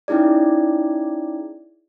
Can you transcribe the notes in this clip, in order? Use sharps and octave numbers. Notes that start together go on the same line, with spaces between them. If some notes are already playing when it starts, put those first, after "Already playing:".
C#4 D#4 E4 G#4 D5